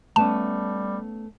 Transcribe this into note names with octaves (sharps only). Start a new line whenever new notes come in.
G3 A3 B3 C#4 A5